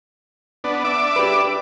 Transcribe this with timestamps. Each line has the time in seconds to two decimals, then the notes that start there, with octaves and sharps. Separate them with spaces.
0.64 B3 D4
0.84 D4 E5 D6
1.16 G4 B4